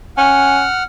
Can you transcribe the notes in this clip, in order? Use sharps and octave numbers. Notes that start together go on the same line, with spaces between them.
C#4 F#5 F6